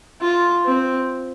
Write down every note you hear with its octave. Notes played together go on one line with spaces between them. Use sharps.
F4
C4